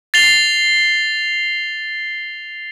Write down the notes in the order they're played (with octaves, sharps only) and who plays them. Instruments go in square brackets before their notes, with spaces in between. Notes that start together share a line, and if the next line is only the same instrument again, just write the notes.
[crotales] A6 C7 F7 G7